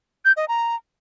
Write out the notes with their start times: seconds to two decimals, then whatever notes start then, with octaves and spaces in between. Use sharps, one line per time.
0.25 G6
0.37 D#5
0.48 A#5